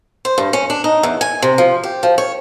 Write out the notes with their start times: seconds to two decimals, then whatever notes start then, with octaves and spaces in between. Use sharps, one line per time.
0.25 C5
0.38 G2
0.53 C#4
0.70 D4
0.84 D#4
1.03 E2
1.21 G#5
1.42 C3
1.58 F3
1.84 G4
2.03 F3
2.18 C#5